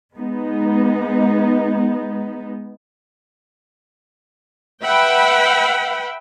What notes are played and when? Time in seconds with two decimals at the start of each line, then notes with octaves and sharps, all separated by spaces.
0.19 G#3 B3 D#4
4.83 B4 E5 F#5 G5 B5